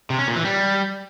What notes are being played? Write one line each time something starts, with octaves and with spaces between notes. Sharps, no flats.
C3
C#4
A#2
E3
G3